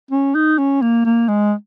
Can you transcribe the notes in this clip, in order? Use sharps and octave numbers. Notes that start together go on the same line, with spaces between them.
C#4
D#4
C#4
A#3
A#3
G#3